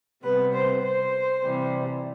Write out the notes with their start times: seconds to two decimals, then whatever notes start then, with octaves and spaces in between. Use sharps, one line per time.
0.24 C3 G3 B3 B4
0.54 C5
0.84 C5
1.43 C3 E3 G3